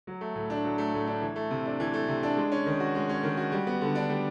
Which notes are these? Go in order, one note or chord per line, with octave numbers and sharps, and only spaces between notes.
F#3
A3
A2
D4
F#3
A3
A2
D4
E3
A3
C3
D4
E3
A3
C3
D4
G#3
C#4
D#3
F#4
G#3
C#4
D#3
F#4
G3
B3
D3
D4
G3